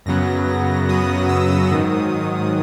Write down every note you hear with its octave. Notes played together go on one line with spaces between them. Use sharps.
F#2 C#3 F#3 B3 A#6
F#2 C#3 F#3 B3 D#6
E6
G#2 D#3 F#3 D#6